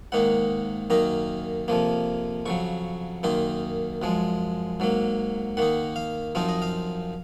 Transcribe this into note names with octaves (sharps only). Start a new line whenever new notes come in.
G#2 D#3 A#3 D#4 F#5
F#2 D#3 A#3 D#4 A#5
F2 C3 F3 A#3
F2 C#3 F#3 C#6
F#2 D#3 A#3 D#4 C6
F#2 F3 G#3
G#2 F#3 A#3
D#3 A#3 D#4 F#5
F5
F#2 F3 C4 D#4 F5
D#5
F5